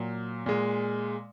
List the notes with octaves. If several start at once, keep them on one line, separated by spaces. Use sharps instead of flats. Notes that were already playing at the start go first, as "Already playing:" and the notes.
Already playing: A#2 F#3
A#2 G#3